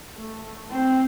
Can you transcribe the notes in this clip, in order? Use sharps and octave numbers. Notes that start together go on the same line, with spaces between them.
A3
C4